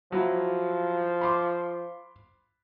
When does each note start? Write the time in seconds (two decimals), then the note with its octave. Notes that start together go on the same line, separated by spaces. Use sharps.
0.12 F3 F#3 E4
1.21 B5 C6 D6